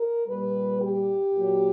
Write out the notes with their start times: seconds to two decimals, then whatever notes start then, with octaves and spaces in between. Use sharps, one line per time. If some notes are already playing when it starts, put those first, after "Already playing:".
Already playing: A#4
0.27 A#2 G3 B4
0.81 G4
1.33 A#2 F#3